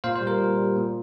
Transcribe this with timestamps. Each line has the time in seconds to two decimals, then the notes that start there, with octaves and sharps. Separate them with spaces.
0.04 A#2 C5 F5
0.15 C5
0.21 G3
0.27 A#4
0.39 A#2
0.57 G3
0.76 A#2